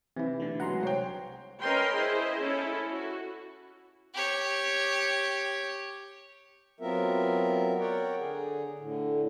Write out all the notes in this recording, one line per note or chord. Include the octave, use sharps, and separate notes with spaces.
C3 E3 E4
B2 D3 A3
F#3 G#3 B4 F#5 A#5 C6
C2 C5 C#5 G5
C#4 A#4 B4 D#5 G5 C6
E4 G#4 C5 D#5
C#4 E4 A4
F#4
G4 C#5
F#3 B3 C4 F4 A#4 E5
A#4 C#5 D5 F#5 G5
D3 G#4
A2 D3